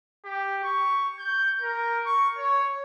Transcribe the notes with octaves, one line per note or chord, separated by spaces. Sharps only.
G4
C#6
G6
A#4
C#6
C#5